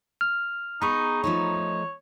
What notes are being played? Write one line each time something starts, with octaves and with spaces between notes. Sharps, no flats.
F6
B3 D#4 G#4 A#5 B5 C#6
F3 A3 D#4 C#5